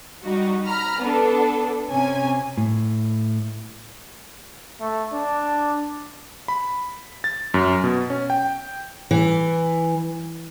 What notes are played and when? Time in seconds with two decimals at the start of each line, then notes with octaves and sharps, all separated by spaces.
0.23 G3 D#4 F#4
0.66 A#5 B5 F6
1.02 B3 D4 A4
1.90 C3 C#4 G#5
2.58 A2
4.81 A3
5.12 D4
6.48 B5
7.24 A6
7.54 F#2
7.84 B2
8.10 C#4
8.30 G5
9.11 E3